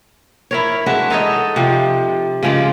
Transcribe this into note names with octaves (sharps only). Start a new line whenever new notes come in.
E4 A#4 C#5
G#3 D4 F#4 E5
D#4 A4 C#5 D#5
C3 F3
C#3 F3 G#3 D5